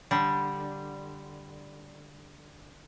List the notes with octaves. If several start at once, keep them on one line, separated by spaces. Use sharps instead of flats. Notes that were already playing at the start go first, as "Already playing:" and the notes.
D3 G3